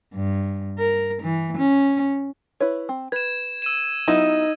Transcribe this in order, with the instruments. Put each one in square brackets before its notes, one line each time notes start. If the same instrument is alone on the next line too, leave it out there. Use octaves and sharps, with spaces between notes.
[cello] G2
A#4
E3
C#4
[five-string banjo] E4 B4 C#5
C4
[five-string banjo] B4 [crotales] G#6 E7
[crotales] E6 D#7 E7
[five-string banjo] F#3 B3 E4 [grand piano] D#4